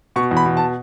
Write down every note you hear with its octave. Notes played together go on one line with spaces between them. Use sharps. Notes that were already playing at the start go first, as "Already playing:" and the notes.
B2 C#6
E2
B5
B2
A5